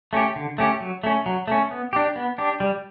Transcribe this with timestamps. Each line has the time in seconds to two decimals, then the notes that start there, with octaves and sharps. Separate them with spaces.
0.13 A3 C#4 G4
0.36 D3
0.58 A3 C#4 G4
0.80 F#3
1.04 A3 C#4
1.26 F#3
1.48 A3 C#4
1.71 B3
1.93 D4 G4
2.16 B3
2.38 D4 G4
2.60 G3